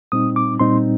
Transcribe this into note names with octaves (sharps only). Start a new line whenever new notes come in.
A#2 G3 C4 D#4 D#6
D6
A#2 G3 C4 D#4 C6